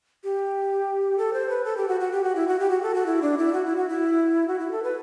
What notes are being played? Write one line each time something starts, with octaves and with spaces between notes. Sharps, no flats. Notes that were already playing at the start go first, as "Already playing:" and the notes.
G4
A4
C5
B4
A4
G4
F#4
F#4
G4
F#4
E4
F#4
G4
F#4
A4
F#4
E4
D4
E4
F#4
E4
F#4
E4
F#4
E4
A4
B4